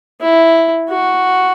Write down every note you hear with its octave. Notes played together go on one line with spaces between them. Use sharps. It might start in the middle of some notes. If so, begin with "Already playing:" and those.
E4
F#4